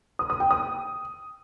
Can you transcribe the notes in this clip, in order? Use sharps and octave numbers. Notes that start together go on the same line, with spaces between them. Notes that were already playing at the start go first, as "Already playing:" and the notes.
D#6
D#6
G5
D#6